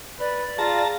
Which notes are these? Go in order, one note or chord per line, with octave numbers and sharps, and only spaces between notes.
B4 D5
F4 G#4 F5 A5 A#5